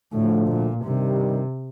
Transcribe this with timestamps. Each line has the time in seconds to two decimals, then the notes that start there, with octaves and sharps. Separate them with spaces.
0.13 D2 A2 D3 F3 A3
0.49 A#2
0.84 G2 C3 D#3 G3